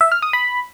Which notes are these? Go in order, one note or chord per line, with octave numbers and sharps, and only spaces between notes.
E5
F6
D#6
B5